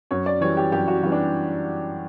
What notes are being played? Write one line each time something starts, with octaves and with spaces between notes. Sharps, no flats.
F#2 C#5
D5
E3 G3 C#5
G4
F#2 G4
F#4
E3 G3 F#4
D4